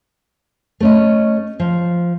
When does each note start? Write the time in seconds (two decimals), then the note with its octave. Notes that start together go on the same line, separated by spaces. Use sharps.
0.80 A3 C#4 D#5
1.60 F3